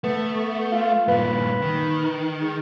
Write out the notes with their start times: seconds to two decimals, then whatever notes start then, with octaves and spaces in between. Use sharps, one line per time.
0.04 A3 B3
0.72 F4
1.08 G2 A#2 B4
1.62 D#3
2.41 G#3